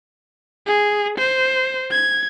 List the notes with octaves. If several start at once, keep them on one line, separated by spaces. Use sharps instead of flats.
G#4
C5
G#6